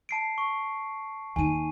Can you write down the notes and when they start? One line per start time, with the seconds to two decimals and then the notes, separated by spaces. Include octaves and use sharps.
0.09 A5 C7 D7
0.38 C#6
1.36 D#2 D#4 G#5 D#7